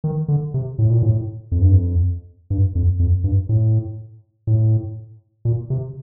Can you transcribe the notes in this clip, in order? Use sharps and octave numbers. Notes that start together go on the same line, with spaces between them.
D#3
D3
C3
A2
A#2
A2
F2
G2
F2
G2
F2
F2
G2
A2
A2
A#2
C3